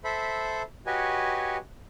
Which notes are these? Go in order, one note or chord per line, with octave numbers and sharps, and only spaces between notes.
A4 C5 E5 B5
F#4 G4 B4 C#5 D#5 G#5